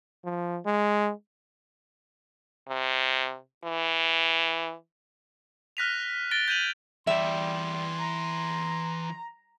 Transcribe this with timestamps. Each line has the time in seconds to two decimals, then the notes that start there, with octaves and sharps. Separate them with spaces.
0.25 F3
0.66 G#3
2.68 C3
3.64 E3
5.77 F6 F#6 A#6 B6 D#7 F7
6.31 A6 A#6 D7 G7
6.48 G6 G#6 D#7 F7 F#7
7.07 E3 G3 D5 E5 C6
7.99 A#5